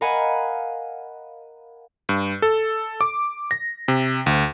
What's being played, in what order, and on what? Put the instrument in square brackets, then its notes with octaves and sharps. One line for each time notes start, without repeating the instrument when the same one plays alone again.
[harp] A#4 D#5 F5 F#5 G#5 B5
[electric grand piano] G2
A4
D6
A#6
C3
D2